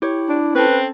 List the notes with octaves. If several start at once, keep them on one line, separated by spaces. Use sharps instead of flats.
E4 G4 C#5
D4
C4 C#4 A4 B4